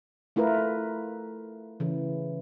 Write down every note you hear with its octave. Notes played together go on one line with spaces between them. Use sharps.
A3 E4 F4 A#4 B4
C#3 E3